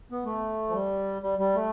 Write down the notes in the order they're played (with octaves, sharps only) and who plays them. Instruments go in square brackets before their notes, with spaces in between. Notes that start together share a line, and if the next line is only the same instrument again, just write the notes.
[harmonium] B3
A3
F3
G3
G3
G3
A3